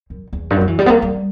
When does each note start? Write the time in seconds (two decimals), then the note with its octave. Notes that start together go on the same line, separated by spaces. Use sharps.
0.10 F#2
0.33 E2
0.50 G2
0.56 F#2
0.61 F#3
0.68 E3
0.79 G3
0.86 B3
0.90 A#3
1.02 G3